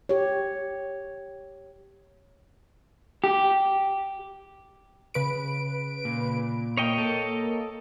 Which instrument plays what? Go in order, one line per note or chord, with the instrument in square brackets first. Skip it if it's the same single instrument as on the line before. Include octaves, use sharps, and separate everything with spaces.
[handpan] G4 C#5
[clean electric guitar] G4
[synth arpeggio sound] C#3 B4 D7
[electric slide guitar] A#2
[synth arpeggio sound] A#3 [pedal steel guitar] C#5 D#5 G5
[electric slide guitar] A4